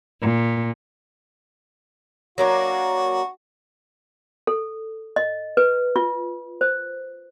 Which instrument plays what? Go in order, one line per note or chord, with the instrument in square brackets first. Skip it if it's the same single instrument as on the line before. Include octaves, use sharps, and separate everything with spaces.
[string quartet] A#2
[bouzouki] F#3 A#3 D4 [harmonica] F#4
[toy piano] A4
D#5
B4
F4
C5